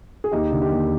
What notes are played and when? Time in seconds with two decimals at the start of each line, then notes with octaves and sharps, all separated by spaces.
0.24 G#4
0.32 D#2 D#4 G4
0.52 D3
0.62 D#4 G4
0.72 D#2